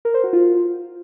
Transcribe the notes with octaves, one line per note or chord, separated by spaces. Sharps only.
A#4
C5
F#4
F4